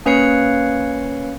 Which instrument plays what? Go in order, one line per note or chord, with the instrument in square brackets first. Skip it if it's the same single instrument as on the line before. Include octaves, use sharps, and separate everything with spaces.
[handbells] A#3 C#4 B4 C#5 F5 C#7